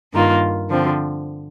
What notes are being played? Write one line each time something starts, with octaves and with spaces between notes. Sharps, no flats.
G2 D#3 A#3 F4
D3 F3 C4